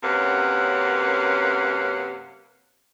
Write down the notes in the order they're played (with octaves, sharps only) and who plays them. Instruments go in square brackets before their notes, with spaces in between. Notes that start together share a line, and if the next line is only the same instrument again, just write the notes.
[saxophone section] F#2 C3 A#3 C#4 B4 F#5